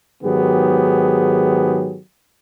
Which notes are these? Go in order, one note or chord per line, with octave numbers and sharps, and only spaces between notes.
G#2 D#3 F#3 B3 G4 G#4